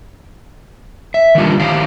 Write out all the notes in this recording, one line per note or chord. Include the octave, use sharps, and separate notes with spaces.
E5
D#3 E3 G3 A#3 D4 F4
D#3 F#3 E4 G4 F5